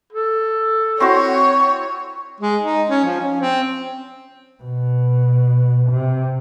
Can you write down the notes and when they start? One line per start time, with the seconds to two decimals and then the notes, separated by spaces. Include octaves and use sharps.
0.12 A4
1.00 C4 E4 F#4 C#5 C#6
2.41 G#3
2.63 D#4
2.90 C#4
3.05 F3
3.21 C#4
3.41 C4
4.63 B2
5.90 C3